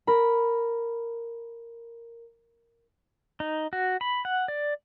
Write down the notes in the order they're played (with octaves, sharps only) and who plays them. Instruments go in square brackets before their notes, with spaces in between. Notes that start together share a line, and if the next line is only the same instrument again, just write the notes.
[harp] A#4 B5
[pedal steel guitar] D#4
F#4
B5
F#5
D5